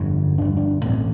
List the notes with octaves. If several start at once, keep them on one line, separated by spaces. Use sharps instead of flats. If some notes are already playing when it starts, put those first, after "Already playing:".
Already playing: G1 F2 D3
G1 F2 D3 D4
D4
A1 A2 C4